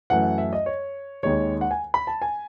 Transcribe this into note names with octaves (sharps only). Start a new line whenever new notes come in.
F#2 E3 A3 F#5
E5
D#5
C#5
D#2 D#3 G#3 C#5
F#5
G#5
B5
A5
G#5